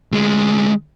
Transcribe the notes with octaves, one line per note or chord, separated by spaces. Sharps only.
D2 G#3